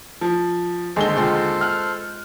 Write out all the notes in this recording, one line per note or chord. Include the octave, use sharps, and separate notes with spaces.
F3
D#2 D3 G#3 A4 C5 G7
G#3 C4 F4
F6 F#6